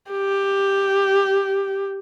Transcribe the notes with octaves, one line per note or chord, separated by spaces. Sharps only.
G4